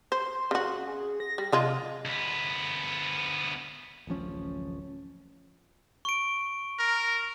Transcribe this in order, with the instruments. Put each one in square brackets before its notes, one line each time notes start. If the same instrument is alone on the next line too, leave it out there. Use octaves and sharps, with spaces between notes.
[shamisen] C5 [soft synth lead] C6
[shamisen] C#3 F#4
[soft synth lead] G#4
A#6
[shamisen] G3
[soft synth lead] C3 [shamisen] F3 G#3 F4
[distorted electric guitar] D2 B3
[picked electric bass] D1 A1 F3 C#4
[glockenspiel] C#6 D7
[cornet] A#4